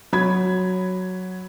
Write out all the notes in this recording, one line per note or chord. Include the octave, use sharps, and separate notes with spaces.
F#3 B5 G#6